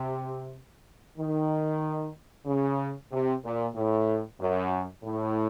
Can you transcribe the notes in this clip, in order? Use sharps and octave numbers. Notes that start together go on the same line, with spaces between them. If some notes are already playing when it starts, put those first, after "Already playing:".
Already playing: C3
D#3
C#3
C3
A#2
A2
F#2
A2